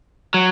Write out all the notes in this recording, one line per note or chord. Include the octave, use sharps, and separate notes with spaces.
F#3